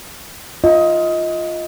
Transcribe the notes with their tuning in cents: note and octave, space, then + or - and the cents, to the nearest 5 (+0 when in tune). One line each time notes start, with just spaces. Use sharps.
F4 +0 D#5 +20